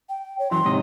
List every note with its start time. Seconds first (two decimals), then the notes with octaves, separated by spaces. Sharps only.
0.09 G5
0.39 C#5
0.51 F#2 E3 F#3 C6
0.65 G#2 C3 D#5